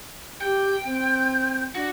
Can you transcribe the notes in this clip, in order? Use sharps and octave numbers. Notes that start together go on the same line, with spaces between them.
G4 G5
C4
D4 F#4